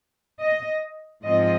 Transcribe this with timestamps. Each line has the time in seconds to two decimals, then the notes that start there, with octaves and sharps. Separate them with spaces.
0.42 D#5
1.25 G#2 F3 C4 D#5